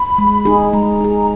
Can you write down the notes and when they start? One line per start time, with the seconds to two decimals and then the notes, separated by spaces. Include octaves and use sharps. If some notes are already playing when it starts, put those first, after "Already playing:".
Already playing: B5
0.18 G#3
0.45 D#4 G#4
0.73 G#3 A#5
1.00 D#4 G#4